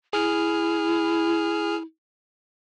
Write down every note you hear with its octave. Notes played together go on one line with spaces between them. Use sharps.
E4 G#4 F6